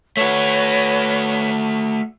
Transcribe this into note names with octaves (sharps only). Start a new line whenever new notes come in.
A3 F#4 B4 C#5